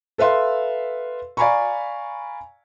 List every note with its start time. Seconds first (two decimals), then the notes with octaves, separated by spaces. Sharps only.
0.18 A4 B4 E5 F5 C6
1.37 D5 F5 G#5 A#5 B5 C#6